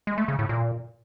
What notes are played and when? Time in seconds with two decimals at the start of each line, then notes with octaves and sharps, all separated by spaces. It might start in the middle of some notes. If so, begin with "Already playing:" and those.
0.07 G#3
0.18 A3
0.28 C#3
0.39 A2
0.49 A#2